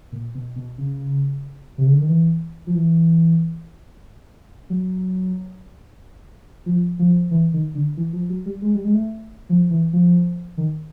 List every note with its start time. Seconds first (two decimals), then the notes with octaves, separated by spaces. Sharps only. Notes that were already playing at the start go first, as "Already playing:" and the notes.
0.12 A#2
0.35 B2
0.56 B2
0.78 C#3
1.78 C3
1.86 C#3
1.93 D3
2.01 D#3
2.09 E3
2.67 F3
2.75 E3
4.70 F#3
6.66 F3
6.99 F3
7.31 E3
7.54 D#3
7.75 D3
7.97 E3
8.13 F3
8.29 F#3
8.46 G3
8.62 G#3
8.75 G3
8.85 G#3
8.94 A3
9.49 F3
9.70 E3
9.93 F3
10.57 D#3